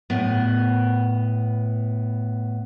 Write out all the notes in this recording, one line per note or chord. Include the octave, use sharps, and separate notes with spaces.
A2 B3